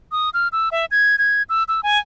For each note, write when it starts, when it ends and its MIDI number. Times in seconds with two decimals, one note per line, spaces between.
0.12 0.30 87
0.34 0.48 89
0.52 0.69 88
0.72 0.85 76
0.91 1.16 92
1.19 1.43 92
1.49 1.64 88
1.68 1.81 88
1.83 1.99 80